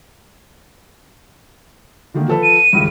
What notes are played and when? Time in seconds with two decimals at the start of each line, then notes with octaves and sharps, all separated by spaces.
2.14 D3 D#3 A#3
2.28 F3 A4 B4
2.43 D#7
2.73 G#1 C#2 G2